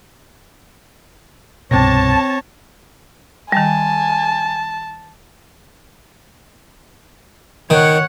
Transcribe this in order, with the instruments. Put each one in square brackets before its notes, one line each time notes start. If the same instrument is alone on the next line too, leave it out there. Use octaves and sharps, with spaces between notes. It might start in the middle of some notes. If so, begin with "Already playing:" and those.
[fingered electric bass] C2 G2 B2 [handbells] C4 A#6 [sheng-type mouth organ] C#5 [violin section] A5
[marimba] D#3 G3 [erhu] G#5 [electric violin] A5
[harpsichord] D#3 [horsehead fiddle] C#5 F#5